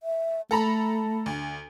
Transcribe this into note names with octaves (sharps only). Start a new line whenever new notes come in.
E5
A3 A4 A#5 B5
D2